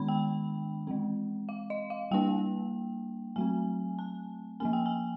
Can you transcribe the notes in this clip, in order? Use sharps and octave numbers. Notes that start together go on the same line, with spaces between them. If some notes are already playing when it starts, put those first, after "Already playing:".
Already playing: D#3 G#3 B3 D4 B5
G5
E3 G#3 C4
F5
D#5
F5
G3 A#3 D4 G5
F#3 A3 C4 G#5
A5
F3 A#3 C#4 G#5
G5
G#5